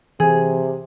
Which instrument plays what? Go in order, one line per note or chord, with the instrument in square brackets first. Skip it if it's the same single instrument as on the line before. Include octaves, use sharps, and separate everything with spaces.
[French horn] C3 [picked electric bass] E3 [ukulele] G#4